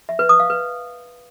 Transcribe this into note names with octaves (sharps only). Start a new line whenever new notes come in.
E5
B4
D#6
F5
B4